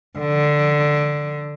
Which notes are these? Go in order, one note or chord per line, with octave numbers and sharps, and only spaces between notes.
D3